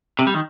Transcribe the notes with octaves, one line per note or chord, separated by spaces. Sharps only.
C3
G3
D#3